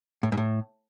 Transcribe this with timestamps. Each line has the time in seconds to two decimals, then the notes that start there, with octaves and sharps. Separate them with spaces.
0.23 A2
0.32 G#2
0.37 A2